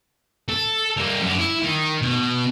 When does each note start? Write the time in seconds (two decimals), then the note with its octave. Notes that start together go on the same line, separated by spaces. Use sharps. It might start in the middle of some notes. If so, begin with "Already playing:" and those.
0.49 A4
0.97 G3 A#3
1.22 F#2 D4
1.39 E4
1.63 D#3
2.02 B2